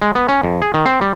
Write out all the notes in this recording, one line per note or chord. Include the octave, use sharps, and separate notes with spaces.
G#3
B3
C#4
F2
G#4
D#3
C4
G3